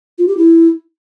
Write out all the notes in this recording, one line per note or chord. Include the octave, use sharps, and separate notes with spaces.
F4
G4
E4